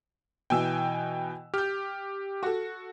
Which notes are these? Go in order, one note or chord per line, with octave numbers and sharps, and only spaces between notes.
B2 E3 G5 G#5 E6
G4 F6 G6
F#4 A4